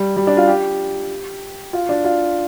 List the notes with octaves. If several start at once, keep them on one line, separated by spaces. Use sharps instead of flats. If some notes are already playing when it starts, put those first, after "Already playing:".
Already playing: G3
G3
D4
F4
G4
F4
D4
F4